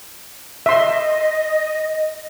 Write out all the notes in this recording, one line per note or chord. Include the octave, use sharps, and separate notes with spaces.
D#5 E5 C6